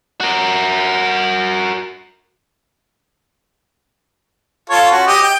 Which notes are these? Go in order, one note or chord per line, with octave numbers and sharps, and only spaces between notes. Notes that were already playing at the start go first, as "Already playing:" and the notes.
F#4 A#4
F4 A4 C#5
C#4 F#4
G4 D#5
G5